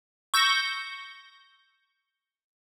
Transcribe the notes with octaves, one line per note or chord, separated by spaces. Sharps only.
C#6 E6 G6 A#6